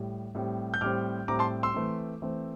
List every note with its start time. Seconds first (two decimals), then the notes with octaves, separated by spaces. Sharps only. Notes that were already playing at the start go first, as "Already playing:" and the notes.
Already playing: A2 G3
0.35 A2 G3 C4
0.74 G6
0.81 A2 G3 C4 D6 F6
1.28 A2 G3 C4 A#5 D6
1.39 A5 C6
1.63 C6 E6
1.74 E3 A3 C4
2.22 E3 A3 C4